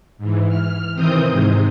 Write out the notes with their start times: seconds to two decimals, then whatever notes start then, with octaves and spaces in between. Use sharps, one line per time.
0.18 G#2 E3
0.48 F6
0.94 C3 D#3 E3 C4 D#6 G6
1.30 G#2 C3 G#3